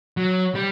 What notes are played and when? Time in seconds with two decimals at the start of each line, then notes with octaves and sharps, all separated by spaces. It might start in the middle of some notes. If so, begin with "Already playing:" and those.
0.17 F#3
0.55 G3